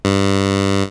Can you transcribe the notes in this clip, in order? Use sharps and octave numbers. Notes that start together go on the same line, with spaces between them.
G2